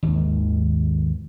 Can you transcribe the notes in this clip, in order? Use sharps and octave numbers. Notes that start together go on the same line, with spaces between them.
G#1 D#2